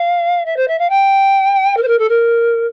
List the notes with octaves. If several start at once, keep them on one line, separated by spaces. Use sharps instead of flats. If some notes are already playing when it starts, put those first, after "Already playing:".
Already playing: F5
E5
C5
E5
F5
G5
A#4
C5
A#4
A4
A#4